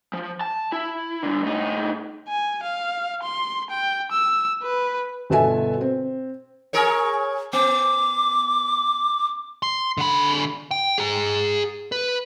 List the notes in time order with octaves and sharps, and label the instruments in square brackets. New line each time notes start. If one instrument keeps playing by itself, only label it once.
[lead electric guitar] F3
A5
E4
G2 D3
A2 D#4
[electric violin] G#5
F5
C6
G5
E6
B4
[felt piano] G1 B2 A4 E5 G#5
C4
[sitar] G#4 A#4 C#5
[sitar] B3 [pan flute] D6
[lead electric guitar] C6
D3 B5
G5
G#4 A#5
B4